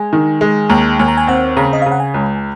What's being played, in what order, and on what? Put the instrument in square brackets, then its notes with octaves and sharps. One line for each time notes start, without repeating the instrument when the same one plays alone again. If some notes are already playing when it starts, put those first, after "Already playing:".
Already playing: [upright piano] G#3 [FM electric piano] G#5
[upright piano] D#3
G#3
[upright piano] D#2 [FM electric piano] A#5
[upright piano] D#2 [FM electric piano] G#5
[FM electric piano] A#5
G#5
[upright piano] C4 [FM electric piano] F#5
[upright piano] C#3 [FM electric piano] A#5
[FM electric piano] D#5
F5
[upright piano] C#3
[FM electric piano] F#5
G#5
[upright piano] C#2